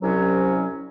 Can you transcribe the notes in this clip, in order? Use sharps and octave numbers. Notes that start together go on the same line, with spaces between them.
C2 F#3 C#4